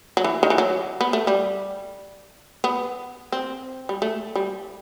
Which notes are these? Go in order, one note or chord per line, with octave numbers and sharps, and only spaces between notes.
F#3
E3
D#3
E3
F#3
B3
A3
G3
B3
C4
G3
A3
G3